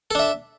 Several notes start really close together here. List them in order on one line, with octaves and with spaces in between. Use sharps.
A4 D4 E5